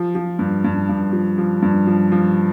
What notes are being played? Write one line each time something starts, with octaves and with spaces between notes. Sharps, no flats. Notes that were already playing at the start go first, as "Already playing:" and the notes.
Already playing: F3
F3
G2
G2
G2
F3
F3
G2
F3
F3